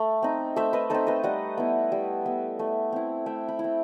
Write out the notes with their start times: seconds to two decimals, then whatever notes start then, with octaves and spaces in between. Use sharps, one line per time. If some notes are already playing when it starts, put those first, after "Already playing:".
Already playing: A3
0.22 C4 D#4
0.56 A3 C5 E5
0.73 B4 D#5
0.90 C4 D#4 A4 C5
1.07 B4 D#5
1.23 G3 D#5 F#5
1.58 B3 E4
1.92 G3
2.26 B3 E4
2.59 A3
2.92 C4 E4
3.26 A3 E5 G5
3.48 G5 B5
3.59 E4
3.64 C4